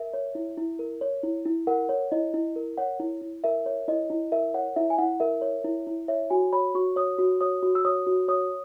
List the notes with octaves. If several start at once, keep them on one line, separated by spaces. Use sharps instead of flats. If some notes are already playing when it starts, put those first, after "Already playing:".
Already playing: A#4 E5
C#5
E4
E4
A#4
C#5
E4
E4
A#4 F#5
C#5
E4 D#5
E4
A#4
C#5 F#5
E4
E4
A#4 E5
C#5
E4 D#5
E4
A#4 E5
C#5 F#5
E4 E5
G#5
E4 F#5
A#4 E5
C#5
E4
E4
C#5 E5
F#4 G#5
C#5 B5
F#4 C#6
C#5 D#6
F#4
C#5 D#6
F#4
E6
C#5 D#6
F#4
C#5 D#6